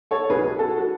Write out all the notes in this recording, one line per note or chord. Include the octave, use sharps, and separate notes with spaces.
A4 C#5
B1 B2 F#3 G#4 B4
F#4 A4
F#4